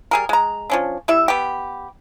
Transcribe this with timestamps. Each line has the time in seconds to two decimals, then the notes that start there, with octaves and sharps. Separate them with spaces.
0.11 G3 G#4 A#4
0.29 G#3 A#5
0.70 F3 C#4 D4
1.08 G3 E4 E5
1.28 B3 G4